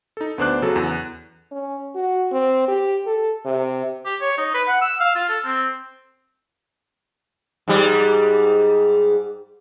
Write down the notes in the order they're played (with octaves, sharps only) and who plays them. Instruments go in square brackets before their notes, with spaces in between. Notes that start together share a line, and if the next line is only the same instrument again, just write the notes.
[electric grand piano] D#4 A4
D2 B3 D4 C5 D6 F#6
C#3 F#3 A4
E2
[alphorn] C#4
F#4
C4
G4
A4
C3
[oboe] G4
C#5
D#4
B4
F#5
E6
F5
F4
A4
C4
[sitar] G#2 G3